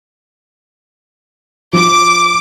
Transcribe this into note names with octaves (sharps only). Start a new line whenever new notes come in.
F3 D6